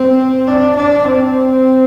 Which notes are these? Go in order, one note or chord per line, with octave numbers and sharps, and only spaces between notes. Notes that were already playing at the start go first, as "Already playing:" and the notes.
Already playing: C4
D4
D4
C4